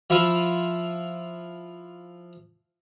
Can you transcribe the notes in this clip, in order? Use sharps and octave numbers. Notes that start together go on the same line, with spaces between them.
F3 E4 F4